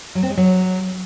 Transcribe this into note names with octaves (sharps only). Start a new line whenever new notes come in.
F#3
C4
G#3
F#3